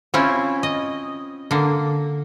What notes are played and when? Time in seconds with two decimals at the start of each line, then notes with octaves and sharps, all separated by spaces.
0.14 C4 C#4 E4 F4
0.63 D#5
1.51 D3 A#3